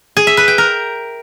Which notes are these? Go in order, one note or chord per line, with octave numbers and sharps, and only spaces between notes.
G#4
E5
B4
G5
A#4